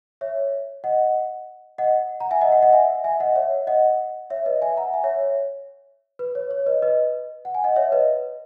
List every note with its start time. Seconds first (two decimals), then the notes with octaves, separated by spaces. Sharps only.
0.21 C#5 E5
0.84 D#5 F#5
1.78 D#5 F#5
2.20 F#5 A#5
2.31 E5 G#5
2.41 D#5 F#5
2.52 D#5 F#5
2.62 D#5 F#5
2.73 E5 G#5
3.04 E5 G#5
3.20 D#5 F#5
3.36 C#5 E5
3.67 D#5 F#5
4.30 C#5 E5
4.46 B4 D#5
4.62 E5 G#5
4.77 F#5 A#5
4.94 E5 G#5
5.04 C#5 E5
5.15 C#5
6.19 B4
6.35 C#5
6.51 C#5
6.66 B4 D#5
6.82 B4 D#5
7.45 F#5
7.55 G#5
7.64 D#5 F#5
7.76 C#5 E5
7.92 B4 D#5